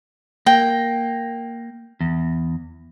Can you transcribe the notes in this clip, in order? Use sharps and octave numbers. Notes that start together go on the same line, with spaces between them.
A#3 G5
E2